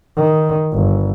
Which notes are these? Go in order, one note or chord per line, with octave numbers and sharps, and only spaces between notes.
D#3
G1